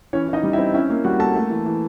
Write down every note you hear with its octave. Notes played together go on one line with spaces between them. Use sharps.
E3 C#4 C#5
E3
D#4 D#5
G3
E4 E5
C4
C#4 E4 E5
A#3
G3 F#4 F#5
A#3 A4 A5
A3
E3
E3